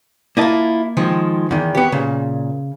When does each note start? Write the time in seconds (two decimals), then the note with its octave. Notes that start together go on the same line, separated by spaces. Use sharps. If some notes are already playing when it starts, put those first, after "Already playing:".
0.37 A#3 E4 F4 D#5 A5
0.97 D#3 F3 G#3
1.51 E2 D#3
1.75 B3 G4 C#5
1.92 A#2 C#3